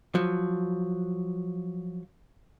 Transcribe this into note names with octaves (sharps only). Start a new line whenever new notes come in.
F3 F#3